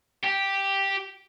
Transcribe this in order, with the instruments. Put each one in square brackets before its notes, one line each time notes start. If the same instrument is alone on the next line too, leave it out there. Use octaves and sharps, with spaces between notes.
[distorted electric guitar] G4